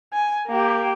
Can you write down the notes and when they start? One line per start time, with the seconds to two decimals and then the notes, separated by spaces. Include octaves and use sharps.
0.13 G#5
0.48 A#3 G4